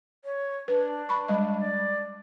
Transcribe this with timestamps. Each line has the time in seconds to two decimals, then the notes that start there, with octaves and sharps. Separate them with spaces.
0.25 C#5
0.68 D4 B4
1.09 B5 C#6
1.28 G3 G#3 D#5
1.60 D5